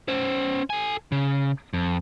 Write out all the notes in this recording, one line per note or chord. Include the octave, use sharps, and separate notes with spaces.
C#4 C5
A4 G#5
C#3
F2